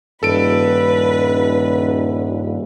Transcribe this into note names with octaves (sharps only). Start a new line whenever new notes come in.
D#1 G2 A4 B4 D7